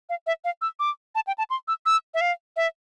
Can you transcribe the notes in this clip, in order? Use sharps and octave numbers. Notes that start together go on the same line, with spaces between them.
F5
E5
F5
E6
D6
A5
G5
A5
C6
E6
E6
E5
F5
E5